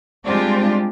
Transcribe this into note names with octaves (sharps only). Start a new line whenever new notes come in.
G3 G#3 C4 D4 F4 G4